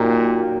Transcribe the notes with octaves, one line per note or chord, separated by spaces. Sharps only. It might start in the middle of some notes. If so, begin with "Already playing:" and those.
Already playing: A#2 F#3 A#3 D#4 G4